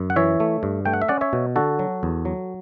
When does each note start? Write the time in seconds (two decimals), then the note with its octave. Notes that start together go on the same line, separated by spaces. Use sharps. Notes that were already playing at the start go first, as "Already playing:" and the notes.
Already playing: F#2
0.10 F#5
0.16 E3 C#5 E5
0.40 A3
0.63 G2
0.85 A3 G5
0.94 F#5
1.02 E5
1.08 C#4 D5 F#5
1.21 C#5 E5
1.33 B2
1.56 D3 F#4 A4
1.79 F#3
2.03 E2
2.25 F#3